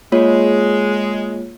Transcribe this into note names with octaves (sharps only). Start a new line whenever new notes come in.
G#3 A#3 F4 C#5